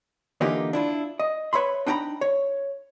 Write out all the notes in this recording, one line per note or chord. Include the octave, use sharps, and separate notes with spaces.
D3 E3 A#3 D#4 F4 G4
D4 E4 F4
D#5
B4 C#5 E5 B5 C6
D4 D#4 G5 G#5 A#5 B5
C#5